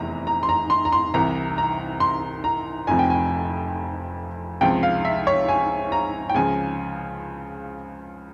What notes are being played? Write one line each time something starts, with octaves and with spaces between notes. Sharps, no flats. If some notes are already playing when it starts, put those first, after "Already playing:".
Already playing: F1 E2 C3 E3 A#5
A#5
C6
A#5
C6
A#5
C6
C2 C3 E3 A#5
A#5
C6
A#5
F1 F2 C3 F3 G#5
G5
G#5
C#2 C3 F3 G5
F5
E5
C#5
G#5
A#5
G5
C#2 C#3 F3 G#5